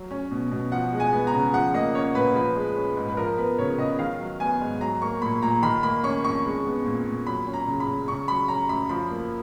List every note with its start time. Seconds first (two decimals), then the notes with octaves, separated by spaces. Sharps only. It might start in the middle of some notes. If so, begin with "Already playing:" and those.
Already playing: F#3
0.11 C#4
0.31 B2
0.51 B2
0.72 F3 F#5
0.93 G#3
1.00 G#5
1.13 B3
1.27 A#5
1.33 C#3
1.53 F3 F#5
1.74 A#3 D#5
1.95 C#4 C#5
2.15 A#2 B4
2.35 F3 B4
2.56 G#3
2.76 C#4
2.97 G#2
3.09 B4
3.17 F3 A#4
3.38 B3 B4
3.58 C#3 C#5
3.78 C#3 D#5
3.99 D#3 F5
4.20 F#3
4.40 B3 G#5
4.61 G#2
4.81 F#3 A#5
5.02 A#3 C#6
5.22 A#2 B5
5.42 A#2 A#5
5.63 D#3 B5
5.83 A#3 B5
6.03 C#4 C#6
6.24 F2 C#6
6.45 G#3
6.65 B3
6.85 A#2
7.06 A#2
7.27 F#3 B5
7.47 C#4
7.54 A#5
7.67 C#3
7.80 B5
7.88 C#3
8.08 C#3 C#6
8.28 F#3 B5
8.48 C#4 A#5
8.69 F#2 B5
8.89 F3 B5
9.10 A#3